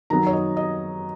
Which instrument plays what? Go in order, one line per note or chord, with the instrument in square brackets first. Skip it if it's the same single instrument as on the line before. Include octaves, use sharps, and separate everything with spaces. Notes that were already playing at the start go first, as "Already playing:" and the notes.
[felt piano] D#3 F#3 B3 A#5
C#5
D#5
D#5